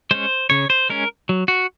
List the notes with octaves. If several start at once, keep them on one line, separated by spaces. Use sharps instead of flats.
G#3 C#4 C5
C#3 C#5
C5
G#3 C#4 A#4
F#3
F#4